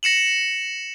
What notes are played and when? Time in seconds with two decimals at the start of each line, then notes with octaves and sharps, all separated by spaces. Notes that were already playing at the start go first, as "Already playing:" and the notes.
0.03 A#6 C#7 E7 F#7